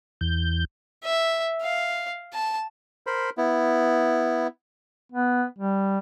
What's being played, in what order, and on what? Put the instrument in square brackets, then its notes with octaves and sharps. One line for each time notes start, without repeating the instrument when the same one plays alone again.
[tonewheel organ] E2 G6
[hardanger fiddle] E5
F5
A5
[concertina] A#4 C5 B5
B3 E4
[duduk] B3
G3